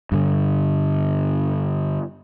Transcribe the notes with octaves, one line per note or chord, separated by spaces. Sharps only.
G2 D3